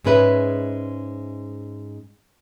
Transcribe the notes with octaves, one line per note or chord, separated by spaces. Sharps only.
G#2 G#3 C#4 B4 E5